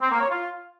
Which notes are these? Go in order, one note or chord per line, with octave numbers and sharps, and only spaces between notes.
C4
A#3
C#5
F4